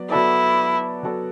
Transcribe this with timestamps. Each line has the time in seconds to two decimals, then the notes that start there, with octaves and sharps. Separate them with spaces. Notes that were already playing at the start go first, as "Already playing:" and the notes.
Already playing: F#3 B3 D5
0.10 F#3 B3 E4 F#4 A4 D5
1.03 F#3 B3 F#4 A4 D5